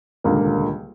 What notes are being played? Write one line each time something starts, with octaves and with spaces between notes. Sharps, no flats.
D#1 C#2 D3 A#3